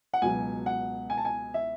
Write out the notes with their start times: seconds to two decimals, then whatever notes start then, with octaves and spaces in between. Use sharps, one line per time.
0.14 F#5
0.22 C#2 B2 F#3 G#5
0.66 F#5
1.10 G#5
1.18 A5
1.25 G#5
1.54 E5